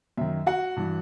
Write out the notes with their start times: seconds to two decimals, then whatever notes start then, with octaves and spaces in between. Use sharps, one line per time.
0.17 F#2 D#3 E5
0.46 F#4 F#5
0.76 G2 E3